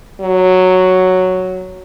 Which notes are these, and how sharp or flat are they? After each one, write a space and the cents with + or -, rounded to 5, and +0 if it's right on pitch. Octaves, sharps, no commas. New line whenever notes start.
F#3 +0